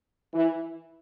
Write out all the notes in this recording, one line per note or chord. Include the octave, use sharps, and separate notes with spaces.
E3